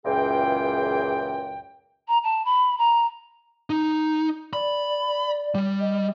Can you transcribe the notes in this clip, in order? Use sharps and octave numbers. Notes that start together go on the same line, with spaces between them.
C#2 F#2 A#2 E3 G#4 G5
A#5
A5
B5
A#5
D#4
D5 B5
G3
D#5